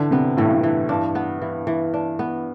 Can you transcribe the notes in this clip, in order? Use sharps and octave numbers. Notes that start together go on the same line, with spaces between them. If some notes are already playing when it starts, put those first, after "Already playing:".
Already playing: D3 E3 D4
C3 B3
A2 E3
G2
A2
E3
G2 D4
B3
E3
E3
D4
B3